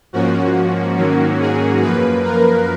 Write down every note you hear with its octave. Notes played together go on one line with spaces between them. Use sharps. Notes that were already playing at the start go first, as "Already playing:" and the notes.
G#2 F3 A#3 C#4 F#4
G#2 D#3 F#3 A#3 C#4
G#4
F#2 F3 A#3 B4
A#4